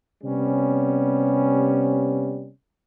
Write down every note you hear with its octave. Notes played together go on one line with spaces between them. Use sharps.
C3 G3 B3 C#4